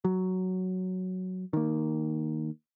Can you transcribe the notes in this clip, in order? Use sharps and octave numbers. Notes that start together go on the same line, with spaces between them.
F#3
D#3 A#3